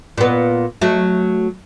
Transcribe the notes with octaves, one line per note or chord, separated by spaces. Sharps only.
A#2 B3
F#3 A3